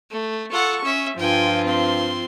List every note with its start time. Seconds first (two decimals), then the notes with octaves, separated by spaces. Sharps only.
0.11 A3
0.52 F4 A4 F#5 C#6
0.85 C#4 E5
1.19 G2 F3 F4 G5 G#5
1.64 C4 C6